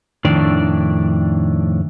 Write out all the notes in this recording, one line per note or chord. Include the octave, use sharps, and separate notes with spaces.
F2 A2 D#3 D4 D5